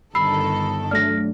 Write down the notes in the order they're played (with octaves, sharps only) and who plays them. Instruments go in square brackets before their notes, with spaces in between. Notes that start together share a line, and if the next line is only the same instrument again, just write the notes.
[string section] G1 D#3 A4 [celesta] B5 E6 C7
[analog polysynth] F#3 A3 D4 [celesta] F6 A#6